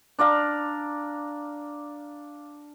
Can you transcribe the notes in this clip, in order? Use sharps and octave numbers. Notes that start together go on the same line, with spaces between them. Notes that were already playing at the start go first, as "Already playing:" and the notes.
D4 D5 F5 A#5